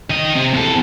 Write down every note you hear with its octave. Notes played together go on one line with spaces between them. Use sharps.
D#3 D#5
C3
E2 A4